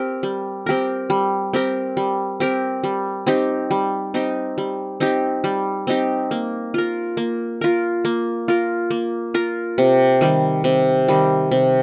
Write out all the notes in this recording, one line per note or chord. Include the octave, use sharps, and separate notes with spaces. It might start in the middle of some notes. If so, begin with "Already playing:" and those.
Already playing: C4 G4 A#4
G3
C4 G4 A#4
G3
C4 G4 A#4
G3
C4 G4 A#4
G3
C4 D#4 G4
G3
C4 D#4 G4
G3
C4 D#4 G4
G3
C4 D#4 G4
A#3
F4 A#4
A#3
F4 A#4
A#3
F4 A#4
A#3
F4 A#4
C3
D#3 G3
C3
D#3 G3
C3